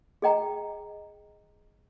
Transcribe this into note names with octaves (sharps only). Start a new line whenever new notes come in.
G#4 D#5 G5 A#5